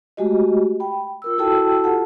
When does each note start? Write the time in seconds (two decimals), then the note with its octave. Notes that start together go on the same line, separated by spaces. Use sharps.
0.17 G#3 A3 F#4 G4 D#5
0.80 G5 B5
1.22 F4 A#4 E6
1.38 E4 F#4 A4 G5 A5 E6
1.84 F4 G4 A4 F#5 A5